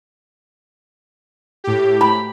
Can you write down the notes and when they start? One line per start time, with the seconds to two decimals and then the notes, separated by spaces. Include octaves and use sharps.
1.64 A2 G4
2.01 B5